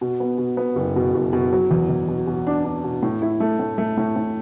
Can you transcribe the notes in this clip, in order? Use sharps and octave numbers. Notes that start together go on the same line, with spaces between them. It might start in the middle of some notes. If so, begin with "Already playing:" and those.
B2
B3
B2
B3
F#1
B2
F#1
B2
F#3
E2
E2
B2
B2
D4
D4
B2
A2
E4
A3
A2
A3
A2
A2